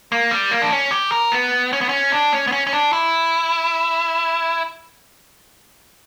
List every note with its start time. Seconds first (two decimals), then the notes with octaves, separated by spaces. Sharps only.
0.12 A#3
0.31 G3
0.51 A#3
0.62 D4
0.71 C#4
0.91 G4
1.12 A#4
1.32 B3
1.73 C#4
1.81 B3
1.89 C#4
2.12 D4
2.33 C#4
2.47 B3
2.52 C#4
2.67 C#4
2.73 D4
2.93 E4